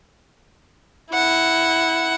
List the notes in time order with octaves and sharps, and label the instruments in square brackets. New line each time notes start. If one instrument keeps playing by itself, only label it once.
[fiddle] E4 F#5